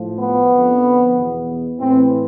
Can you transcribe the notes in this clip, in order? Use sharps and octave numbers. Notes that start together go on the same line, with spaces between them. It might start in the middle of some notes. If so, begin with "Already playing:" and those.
Already playing: A2 F3
B3
F2 D3 F3
E2 B2
A2 E3 C4